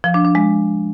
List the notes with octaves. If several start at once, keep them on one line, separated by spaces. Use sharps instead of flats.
F3
D4
D4
G#3